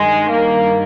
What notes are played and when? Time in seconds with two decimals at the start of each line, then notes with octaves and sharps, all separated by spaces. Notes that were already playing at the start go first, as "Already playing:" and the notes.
Already playing: G2 D#3 G#3
0.30 A#3